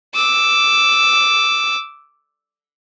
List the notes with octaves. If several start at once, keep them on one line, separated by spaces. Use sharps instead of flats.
D6 E6